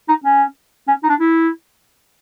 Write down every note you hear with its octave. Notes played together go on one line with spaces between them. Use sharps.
D#4
C#4
C#4
D#4
D4
E4